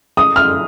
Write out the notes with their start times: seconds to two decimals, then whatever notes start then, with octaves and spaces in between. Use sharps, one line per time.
0.17 D#6
0.36 F6